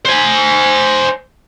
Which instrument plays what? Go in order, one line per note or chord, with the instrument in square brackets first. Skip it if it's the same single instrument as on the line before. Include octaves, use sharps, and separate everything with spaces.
[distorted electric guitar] C5 G#5